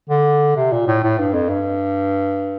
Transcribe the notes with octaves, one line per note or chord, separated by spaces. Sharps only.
D3
C3
A#2
A2
A2
G2
F2
G2